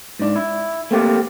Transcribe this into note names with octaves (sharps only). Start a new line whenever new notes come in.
G#2 D4
E4
A3 A#3 C4 G4